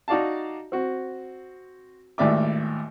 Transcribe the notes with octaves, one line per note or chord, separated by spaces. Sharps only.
D#4 F#4 D5 F5 A5
C4 F#4
G#1 D#2 A2 D5 E5 D6